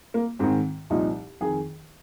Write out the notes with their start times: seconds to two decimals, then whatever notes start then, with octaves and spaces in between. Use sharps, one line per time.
0.14 A#3
0.39 G#2 D#3 C4
0.90 C2 A#2 F3 D#4
1.41 F2 D#3 G#4